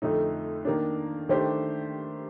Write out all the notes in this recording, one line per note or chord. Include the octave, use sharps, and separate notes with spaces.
F2 D3 A3 D#4
D#3 A#3 D4
D#3 A3 D4 G4 C5